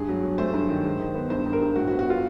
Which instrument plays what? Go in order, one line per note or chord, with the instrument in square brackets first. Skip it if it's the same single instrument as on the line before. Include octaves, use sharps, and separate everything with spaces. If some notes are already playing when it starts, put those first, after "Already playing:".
Already playing: [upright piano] G2 G#4
F#3
F#3
A3 C5
G2
D#3
G#3
D#3
B3
G2 C5
G2
A#4
G2
A2 F#4
F#4
B3
F#4
B3 F4